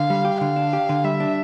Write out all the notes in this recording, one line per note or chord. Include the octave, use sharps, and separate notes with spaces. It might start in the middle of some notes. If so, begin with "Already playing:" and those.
Already playing: D3 F5
G3
G4
D3 F5
D4
G4
D3
G3 E5
D4